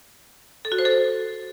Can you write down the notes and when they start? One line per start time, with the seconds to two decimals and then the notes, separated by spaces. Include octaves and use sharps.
0.65 A4
0.72 F#4
0.79 C5
0.85 A4